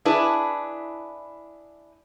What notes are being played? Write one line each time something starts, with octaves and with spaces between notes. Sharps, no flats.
D4 E4 G#4 B4